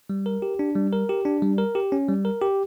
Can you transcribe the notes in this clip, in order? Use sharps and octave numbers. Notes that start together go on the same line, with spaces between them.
G3
A#4
G4
D4
G3
A#4
G4
D4
G3
A#4
G4
C#4
G3
A#4
G4